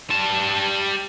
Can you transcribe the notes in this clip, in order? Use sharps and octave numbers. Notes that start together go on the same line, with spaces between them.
G3 A5